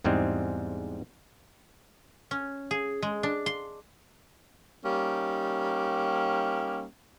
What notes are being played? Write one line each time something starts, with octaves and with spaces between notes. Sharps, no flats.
E2 G#2 G3 G#3 C4
C#4
G#4
G#3
D4
C6
G3 A#3 C#4 D#4